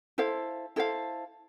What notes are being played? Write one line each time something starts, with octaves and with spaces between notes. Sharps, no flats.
E4 A4 C5 F5
E4 A4 C5 F5